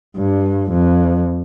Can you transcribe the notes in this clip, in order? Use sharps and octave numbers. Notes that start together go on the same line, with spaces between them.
G2
F2